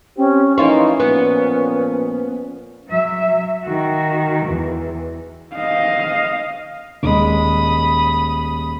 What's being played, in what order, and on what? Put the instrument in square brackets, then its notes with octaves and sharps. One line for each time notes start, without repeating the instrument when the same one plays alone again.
[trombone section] C4 G4 [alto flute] C#4
[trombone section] E3 F3 D#4 [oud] A#3 F4 C#5 [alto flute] C#4
[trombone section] A#2 F3 [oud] B3
[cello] F#3 E5
D#3 F#4
E2
[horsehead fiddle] D#5 F5
[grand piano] D#1 G#3 [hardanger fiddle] B5 D#6